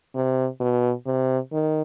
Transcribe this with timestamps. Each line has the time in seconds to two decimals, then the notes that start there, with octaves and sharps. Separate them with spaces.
0.15 C3
0.60 B2
1.06 C3
1.52 D#3